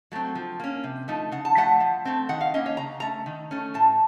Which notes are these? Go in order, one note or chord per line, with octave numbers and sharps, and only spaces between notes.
F#3 A3 C4
F3
A#3 C#4
C3
F3 A3 D#4
C#3 F#5
A5
F3 A3 F#5
F3
A3 C4
D#3 F#5
F5
A#3 C#4 D#5
C#5
C#3 A#5
A3 C#4 A#5
D#3
A3 C#4
A2 A5